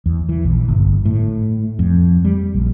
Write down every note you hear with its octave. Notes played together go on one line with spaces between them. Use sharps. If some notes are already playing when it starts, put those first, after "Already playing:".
E2
E3
A#1
G1
A2
F2
G3
A#1